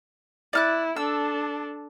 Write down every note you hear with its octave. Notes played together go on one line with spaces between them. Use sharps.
E4 D5 F6 F#6
D4 A4 E6